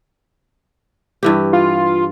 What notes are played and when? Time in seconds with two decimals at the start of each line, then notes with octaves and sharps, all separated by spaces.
1.23 G2 E3 G4
1.53 F4